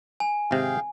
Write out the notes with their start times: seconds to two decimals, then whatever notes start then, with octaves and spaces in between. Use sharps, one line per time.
0.20 G#5
0.51 G#1 C3 G#4 F5 G5